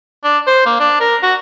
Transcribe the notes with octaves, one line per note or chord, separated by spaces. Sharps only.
D4
C5
A#3
D4
A#4
F#4